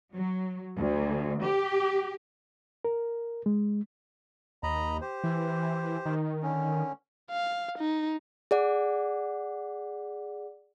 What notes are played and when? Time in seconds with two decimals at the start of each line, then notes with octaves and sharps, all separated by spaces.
0.13 F#3
0.78 D2
1.44 G4
2.85 A#4
3.46 G#3
4.63 D#2 D#5 A#5 B5
5.01 G4 C5
5.24 E3
6.06 D#3
6.43 D3 C#4
7.31 F5
7.78 D#4
8.51 G#4 D5 F#5